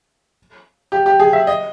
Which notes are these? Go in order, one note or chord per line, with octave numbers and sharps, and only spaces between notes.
G4
G4
G#4
E5
D#5